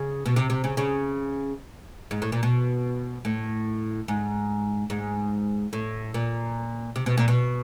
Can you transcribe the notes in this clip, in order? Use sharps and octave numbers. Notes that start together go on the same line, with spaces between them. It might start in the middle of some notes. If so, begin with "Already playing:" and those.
Already playing: C#3
B2
C3
C3
C#3
C#3
G#2
A2
A#2
B2
A2
G#2
G#2
A2
A#2
C3
B2
A#2
B2